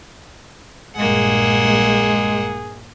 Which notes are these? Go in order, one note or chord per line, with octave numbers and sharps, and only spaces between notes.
A#1 G2 A#2 G#3 A#3 G#4 F#5